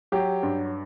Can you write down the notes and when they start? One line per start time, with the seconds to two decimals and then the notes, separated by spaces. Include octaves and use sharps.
0.12 F#3 G4
0.43 G2